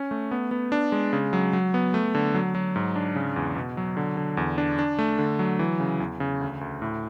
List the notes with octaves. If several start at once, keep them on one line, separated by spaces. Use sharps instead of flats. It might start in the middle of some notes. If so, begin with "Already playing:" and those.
Already playing: C#4
A3
B3
B3
D4
G#3
C#3
F#3
F#3
B3
A3
D3
F#3
F#3
G#2
D4
C#3
E2
B2
F#3
D3
D3
E2
D4
D4
A3
D3
F#3
E3
C#3
E2
C#3
D2
D2
A2